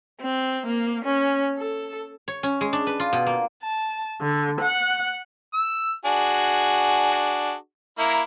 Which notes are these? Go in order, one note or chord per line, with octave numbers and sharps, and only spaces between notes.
C4
A#3
C#4
A4
C#5
C#4
G#3
D4
B4
F4
B2
A#3
A5
D3
F#5
E6
D4 F#4 G#4
A#3 E4 A#5